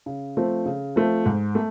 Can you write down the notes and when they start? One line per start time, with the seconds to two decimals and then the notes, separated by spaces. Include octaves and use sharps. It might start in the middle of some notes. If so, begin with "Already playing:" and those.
0.06 C#3
0.37 F3 A3 C4
0.66 C#3
0.96 F3 A3 C4
1.26 G#2
1.55 A3